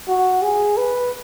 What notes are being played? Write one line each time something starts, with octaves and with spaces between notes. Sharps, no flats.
F#4
G#4
B4